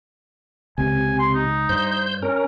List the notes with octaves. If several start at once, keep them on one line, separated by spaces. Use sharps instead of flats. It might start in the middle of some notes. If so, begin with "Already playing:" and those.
C#2 C3 G#5
C6
D#4
G2 C5 G6
C#4 A#4